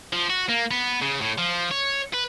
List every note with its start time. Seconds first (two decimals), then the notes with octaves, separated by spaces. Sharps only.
0.13 F3
0.30 F#4
0.49 A#3
0.71 B3
1.02 C#3
1.21 A2
1.38 F3
1.71 C#5
2.14 B4